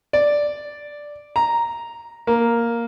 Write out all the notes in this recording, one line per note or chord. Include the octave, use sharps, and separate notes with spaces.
D5
A#5
A#3